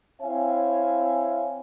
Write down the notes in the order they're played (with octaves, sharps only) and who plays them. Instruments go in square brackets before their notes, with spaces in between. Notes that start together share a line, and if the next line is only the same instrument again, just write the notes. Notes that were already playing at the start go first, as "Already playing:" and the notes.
[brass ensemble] C4 E4 C#5 E5 F5 G#5